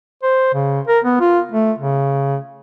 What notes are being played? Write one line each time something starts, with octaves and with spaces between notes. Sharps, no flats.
C5
C#3
A#4
B3
F4
A3
C#3